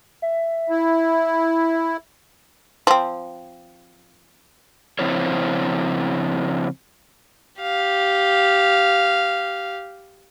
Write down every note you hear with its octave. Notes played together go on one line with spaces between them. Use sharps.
E5
E4
F3 C4
C#3 F3 C4 E4 C5 C#5
G4 F5